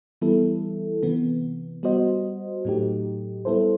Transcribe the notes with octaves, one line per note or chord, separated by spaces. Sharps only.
E3 G3 B3 E4 A4
C3 E3 B3
G3 B3 F#4 C5 D#5
A2 F#3 A3 D#4 G4
G3 B3 E4 A4 C5